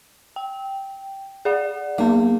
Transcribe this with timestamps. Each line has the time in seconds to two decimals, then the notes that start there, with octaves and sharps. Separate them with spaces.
0.36 G5
1.45 G#4 D5 F#5
1.98 F#3 A#3 B3